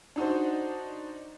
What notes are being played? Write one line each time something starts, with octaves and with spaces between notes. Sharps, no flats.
D4 D#4 F#4 C5